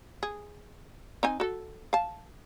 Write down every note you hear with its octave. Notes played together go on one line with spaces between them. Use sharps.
G#4
C4 D#4 G#5
F#4 A4
F5 A5